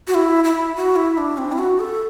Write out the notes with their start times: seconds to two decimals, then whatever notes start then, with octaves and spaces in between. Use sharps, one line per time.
0.07 F#4
0.14 E4
0.44 E4
0.76 F#4
0.96 E4
1.18 D4
1.38 C4
1.52 E4
1.58 F#4
1.79 A4